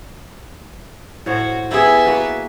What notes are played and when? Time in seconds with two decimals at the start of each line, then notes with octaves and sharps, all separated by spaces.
1.26 A2 F#4 C5 C#5
1.71 B3 E4 G4 G#4 E5
2.06 A#3 F#4 B4